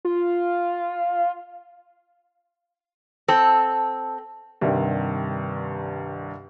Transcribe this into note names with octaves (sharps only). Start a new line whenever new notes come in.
F4
C4 A4
C2 G2 D#3 E5